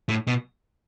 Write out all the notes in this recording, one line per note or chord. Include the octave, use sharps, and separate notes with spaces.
A2
B2